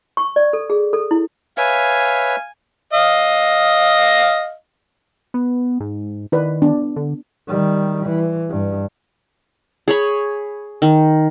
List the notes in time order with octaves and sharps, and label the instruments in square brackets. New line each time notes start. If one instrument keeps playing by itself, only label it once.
[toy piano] C#6
D5
A4
G#4
A4
E4
[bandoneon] B4 C#5 E5 [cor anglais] F5 [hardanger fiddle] G#5
[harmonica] D#5 F5
[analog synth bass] B3
G#2
[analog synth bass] D#3 [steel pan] E4 B4 D5
[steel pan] B3 D4
[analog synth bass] D3
[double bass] D#3 G3
E3
G2
[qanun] G#4 C#5 B5
D#3